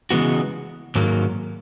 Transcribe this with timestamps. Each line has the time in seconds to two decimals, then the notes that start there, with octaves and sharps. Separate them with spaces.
0.11 C#3 E3 G#3 B3 F#4
0.95 G#2 D#3 F#3 A#3